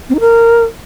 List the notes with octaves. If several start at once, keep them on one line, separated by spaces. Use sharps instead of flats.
C4
D#4
A#4